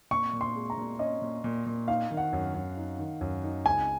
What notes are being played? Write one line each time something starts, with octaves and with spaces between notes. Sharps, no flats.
A#2 C#6
A#2
C6
G#3
A#5
A#2
C#4 D#5
A#2
A#2
A#2
D#4 F5
D#3
F#5
F#2
F#2
D#4
D#3
F#2
D#4
C#2 G#5